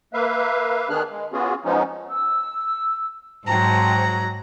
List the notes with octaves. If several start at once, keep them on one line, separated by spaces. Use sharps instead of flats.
A#3 B4 E5 F5
D#3 B3 D4 G#4 F6 F#6
G#3
B3 C#4 F4 F#4 G#4
F3 G#3 B3 C#4 D#4
E6
G#2 F#3 C5 G5 A5 A#5